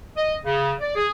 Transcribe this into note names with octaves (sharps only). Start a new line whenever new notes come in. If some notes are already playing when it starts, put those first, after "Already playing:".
D#5
C#3
D5
G#4